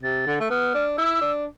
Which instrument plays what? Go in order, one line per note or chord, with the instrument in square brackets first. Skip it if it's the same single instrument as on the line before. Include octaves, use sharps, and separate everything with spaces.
[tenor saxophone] C3 [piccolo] A6
[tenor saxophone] D3
A3
[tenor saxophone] B3 [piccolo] F6
[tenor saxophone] D4
[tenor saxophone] E4 [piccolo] E6
[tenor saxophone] D4